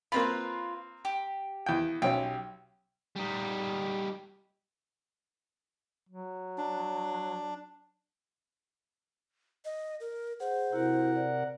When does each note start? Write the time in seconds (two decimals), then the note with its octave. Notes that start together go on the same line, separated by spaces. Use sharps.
0.12 A#3 C4 F4 B4 B5
1.05 G4
1.66 E2 G5
2.02 B1 C#4 G4
3.16 G3 D#4
6.09 F#3
6.58 D4
9.65 D#5
10.00 A#4
10.40 G#4 C5 F#5
10.73 C3 E4 F#4 A#4 F#5
11.16 D5